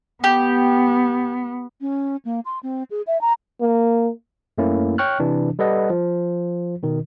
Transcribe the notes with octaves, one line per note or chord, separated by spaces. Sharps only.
B3 G4
C#4
A#3
C6
C4
G#4
E5
A#5
A#3
F#2 A3 A#3 C#4 E4
C#5 G5 C#6 F6 F#6
C3 E3 D4
G3 A4 B4 D#5 F#5
F3
B2 D#3